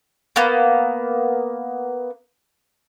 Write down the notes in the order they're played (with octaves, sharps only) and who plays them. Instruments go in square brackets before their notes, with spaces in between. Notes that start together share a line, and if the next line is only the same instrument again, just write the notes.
[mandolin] A#3 B3